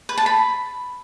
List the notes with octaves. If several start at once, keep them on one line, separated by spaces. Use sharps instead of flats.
B4
A5
B5